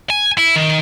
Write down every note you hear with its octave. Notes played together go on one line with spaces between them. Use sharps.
G#5
E4
D#3